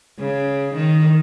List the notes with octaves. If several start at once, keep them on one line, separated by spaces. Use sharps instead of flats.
C#3
D#3